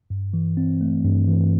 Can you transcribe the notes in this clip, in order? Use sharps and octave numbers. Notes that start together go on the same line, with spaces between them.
G2
E3
C4
A3
G2
E3